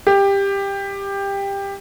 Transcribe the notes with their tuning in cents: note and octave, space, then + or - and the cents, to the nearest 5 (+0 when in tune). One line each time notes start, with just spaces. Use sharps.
G4 +15